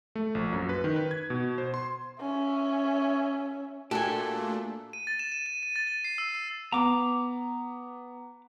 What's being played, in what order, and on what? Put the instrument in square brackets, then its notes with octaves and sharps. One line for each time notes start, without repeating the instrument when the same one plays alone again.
[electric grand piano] A3
A#1
F#2
B4
D#3
B4
G#6
B2
C5
C6
[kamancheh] C#4 E5
[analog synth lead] A#2 [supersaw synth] A3 D4 [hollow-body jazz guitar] F#4 G4 [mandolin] A4 G#5
[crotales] D#7
A6
E7
D#7
D#7
D#7
A6
A6
C7
E6
E6
[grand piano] B3 [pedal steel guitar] A#5 D6